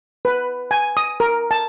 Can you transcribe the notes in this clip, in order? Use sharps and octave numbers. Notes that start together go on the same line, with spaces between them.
B4
G#5
D#6
A#4
A5